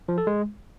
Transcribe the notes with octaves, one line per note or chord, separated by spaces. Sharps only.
F3
A4
G#3